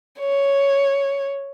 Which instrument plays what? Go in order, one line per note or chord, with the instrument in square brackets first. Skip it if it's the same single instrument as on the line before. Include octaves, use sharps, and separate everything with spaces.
[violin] C#5